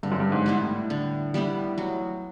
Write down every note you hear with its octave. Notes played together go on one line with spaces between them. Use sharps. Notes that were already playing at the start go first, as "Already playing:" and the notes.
G2 D3
F#2
G2
G#2
G3 B3 E4
A2
D3
G3 B3 E4
F#3